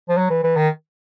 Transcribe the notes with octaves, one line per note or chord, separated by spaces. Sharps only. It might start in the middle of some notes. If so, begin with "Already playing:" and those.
F3
F#3
E3
E3
D#3